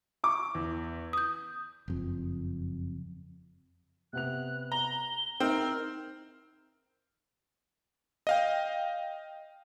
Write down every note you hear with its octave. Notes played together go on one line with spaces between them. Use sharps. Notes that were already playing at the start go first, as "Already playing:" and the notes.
C#6 D6
E2
D#6 G6
F#1 F2
C3 B3 F#6 F7
A#5 G7
C4 D#4 E4 A#4 F6
D#5 F5 G5